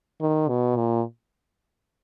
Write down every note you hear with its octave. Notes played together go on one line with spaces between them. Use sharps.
D#3
B2
A#2